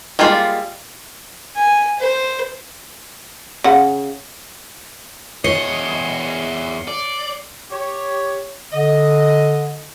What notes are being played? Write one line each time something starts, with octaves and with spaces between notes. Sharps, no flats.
G3 G#3 A#3 F4 F5
G#5
C5
C#3 F#5
E2 C#5 D#5 C7 C#7 G7
D5
G4 C#5
D3 D#5